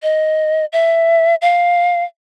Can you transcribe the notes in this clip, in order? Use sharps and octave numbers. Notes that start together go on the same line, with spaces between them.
D#5
E5
F5